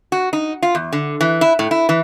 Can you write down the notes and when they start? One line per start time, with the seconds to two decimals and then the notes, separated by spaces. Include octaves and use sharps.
0.12 F#4
0.33 D#4
0.63 F4
0.75 E2
0.93 D3
1.21 E3
1.41 E4
1.59 A2
1.71 E4
1.89 E3